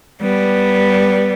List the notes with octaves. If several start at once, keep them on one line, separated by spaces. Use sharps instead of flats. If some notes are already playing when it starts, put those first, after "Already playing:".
G3 B3